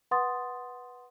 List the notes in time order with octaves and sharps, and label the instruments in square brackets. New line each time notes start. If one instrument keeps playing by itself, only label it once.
[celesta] B4 F#5 C6 D#6 A6